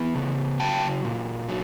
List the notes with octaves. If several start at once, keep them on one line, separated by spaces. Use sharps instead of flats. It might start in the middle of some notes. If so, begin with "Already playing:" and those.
Already playing: E3 B3
C#3
F#3 G5 A5
A#2
F#3